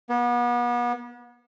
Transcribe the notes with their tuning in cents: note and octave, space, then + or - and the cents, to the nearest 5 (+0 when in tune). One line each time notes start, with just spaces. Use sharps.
B3 -35